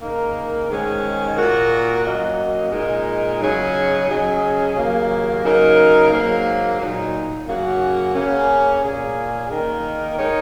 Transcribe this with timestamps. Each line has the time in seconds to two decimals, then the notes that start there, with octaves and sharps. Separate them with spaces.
0.01 C#3 A#3 D#4 A#4
0.68 G#2 D#3 G#3 C#4
1.37 A#2 A#3 F#4 A#4
2.04 F#3 A#3 C#4 F#4 D#5
2.72 A#2 G#3 D#4 A#4 D#5
3.40 C#3 F#3 D#4 G#4 C#5
4.08 C#3 F#3 C#4 G#4 D#5
4.75 D#2 C#3 F#3 A#3
5.44 C#3 F#3 D#4 A#4
6.11 G#2 F#3 A#3
6.79 A#2 F#3 D#4
7.47 F#2 C#3 A#3 F#4
8.15 C#3 A#3 C#4
8.82 A#2 A#3 C#4 G#4
9.50 D#3 A#3 D#4 A#4
10.18 G#3 D#4 A#4 C#5